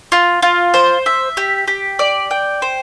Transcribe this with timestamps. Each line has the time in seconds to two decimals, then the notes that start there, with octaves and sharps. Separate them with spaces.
0.12 F4
0.42 F4
0.74 C5
1.06 E5
1.37 G4
1.67 G4
1.99 D5
2.31 G5
2.62 C5